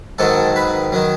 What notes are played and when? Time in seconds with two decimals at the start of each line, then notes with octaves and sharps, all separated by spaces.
0.18 G#2 D#3 F#3 A4
0.56 B4
0.92 D#3 F#3